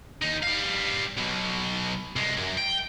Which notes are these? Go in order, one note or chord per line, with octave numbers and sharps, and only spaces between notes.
D#2 D#4
G3 F5
B1 B2
C2 G#3
F#2
G5